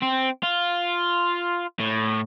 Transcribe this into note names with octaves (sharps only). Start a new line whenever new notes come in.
C4
F4
A2